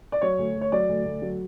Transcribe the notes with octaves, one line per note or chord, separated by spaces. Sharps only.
D5
F#3 C#5
D2
D2
C#5
F#3 D5
D2
D2
F#3